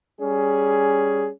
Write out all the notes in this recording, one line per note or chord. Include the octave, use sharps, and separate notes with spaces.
G3 C#4 G#4